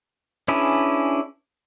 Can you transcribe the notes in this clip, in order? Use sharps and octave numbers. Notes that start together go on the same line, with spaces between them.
C#4 D4 E4 G#4 B4